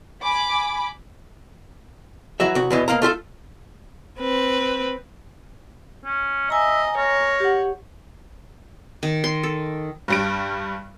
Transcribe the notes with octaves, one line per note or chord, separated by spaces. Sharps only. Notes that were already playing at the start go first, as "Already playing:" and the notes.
G#5 B5 D6
E3 F#3 F#4 E5
C2 F#4
E2 B2 E3
B2 A#3 F5 A#5
A3 F4 G4 A4
C4 B4
C#4
D#5 E5 G#5 A#5
A#4 C#5
G4 F#5
D#3
C6
A4
G2 G3 D7